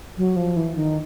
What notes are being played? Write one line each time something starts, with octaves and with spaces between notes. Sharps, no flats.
F#3
F3
E3
D#3